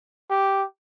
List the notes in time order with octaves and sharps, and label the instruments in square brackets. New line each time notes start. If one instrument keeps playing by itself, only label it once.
[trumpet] G4